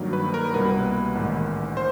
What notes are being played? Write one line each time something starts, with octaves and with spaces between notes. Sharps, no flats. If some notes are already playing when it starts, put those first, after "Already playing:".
Already playing: G2 D#3 F#3 A#3
B4
A#4
C2 B2 G3 A#3 B4
A1 G#2 D#3
C5